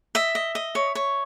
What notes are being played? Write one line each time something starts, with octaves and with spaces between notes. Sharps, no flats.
D#5 E5
D#5
D#5
C#5
C#5